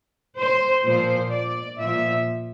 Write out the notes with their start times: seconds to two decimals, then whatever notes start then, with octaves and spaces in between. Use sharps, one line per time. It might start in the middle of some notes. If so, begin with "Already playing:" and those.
0.38 C5
0.84 A#2 F3 C5
1.31 D5
1.79 A#2 F3 E5